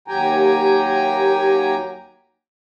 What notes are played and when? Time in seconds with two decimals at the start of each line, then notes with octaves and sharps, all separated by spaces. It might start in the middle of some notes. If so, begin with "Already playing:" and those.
0.08 D#2 F#3 G4 G5 G#5 A#5